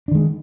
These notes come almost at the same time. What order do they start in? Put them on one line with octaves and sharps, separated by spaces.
D4 D#3 G#3